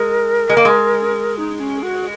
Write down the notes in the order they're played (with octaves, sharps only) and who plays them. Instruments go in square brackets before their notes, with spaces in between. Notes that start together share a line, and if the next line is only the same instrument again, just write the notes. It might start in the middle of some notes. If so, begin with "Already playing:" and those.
Already playing: [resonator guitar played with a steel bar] G#3 [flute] A#4
[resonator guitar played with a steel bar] G#3
A#3
G#3
[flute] D#4
C#4
F#4